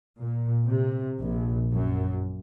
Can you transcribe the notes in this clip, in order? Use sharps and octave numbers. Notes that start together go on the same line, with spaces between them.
A#2
C3
A#1
F#2